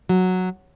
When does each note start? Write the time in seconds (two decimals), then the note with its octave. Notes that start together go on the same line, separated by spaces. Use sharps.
0.09 F#3